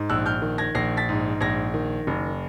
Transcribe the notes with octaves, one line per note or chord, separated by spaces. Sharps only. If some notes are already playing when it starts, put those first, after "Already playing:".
Already playing: G#2
A#1 E6 F#6
F6 G6
D#3
G#6 A#6
A#1 A#6 C7
A6 B6
G#2
A#1 G#6 A#6
D#3
F#1